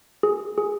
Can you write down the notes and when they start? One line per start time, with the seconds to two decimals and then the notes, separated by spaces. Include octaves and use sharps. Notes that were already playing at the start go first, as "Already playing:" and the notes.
0.23 G#4
0.58 G#4